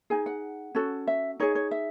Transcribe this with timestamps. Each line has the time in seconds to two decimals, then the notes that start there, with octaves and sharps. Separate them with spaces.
0.10 D#4 G#4 G#5
0.26 F#5
0.75 C#4 F#4 A4
1.07 E5
1.40 D#4 G#4 C#5
1.55 C#5
1.71 E5